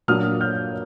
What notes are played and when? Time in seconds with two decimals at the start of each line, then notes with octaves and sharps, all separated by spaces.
0.08 A#2 F#3 A#3 D4 D#6 F6
0.41 F6 G6